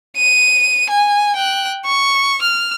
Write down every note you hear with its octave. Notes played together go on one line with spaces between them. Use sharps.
D#7
G#5
G5 F#6
C#6
F6